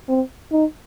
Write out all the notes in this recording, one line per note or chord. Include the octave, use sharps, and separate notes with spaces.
C4
D#4